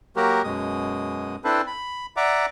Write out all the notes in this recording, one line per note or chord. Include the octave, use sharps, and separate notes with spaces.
F#3 A#3 F#4 G4 A#4
F#2 B2 G#3 D#6
C4 D4 E4 A4 B4 C5
B5
D5 E5 F#5 A#5 D6